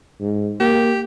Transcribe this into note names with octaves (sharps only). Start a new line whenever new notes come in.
G#2
A#3 G4